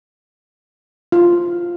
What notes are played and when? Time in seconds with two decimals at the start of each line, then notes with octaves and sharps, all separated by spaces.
1.12 F4